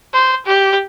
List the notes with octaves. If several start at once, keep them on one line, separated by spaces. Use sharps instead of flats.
C5
G4